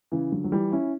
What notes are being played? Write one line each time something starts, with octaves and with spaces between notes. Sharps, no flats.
C#3 E3
D3 F#3
F#3
E3 G3
C#4 E4